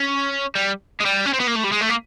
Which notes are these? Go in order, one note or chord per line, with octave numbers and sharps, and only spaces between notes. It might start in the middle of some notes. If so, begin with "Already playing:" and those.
Already playing: C#4
G3
G#3
G3
C#4
C4
B3
A#3
A3
G3
G#3
A3
A#3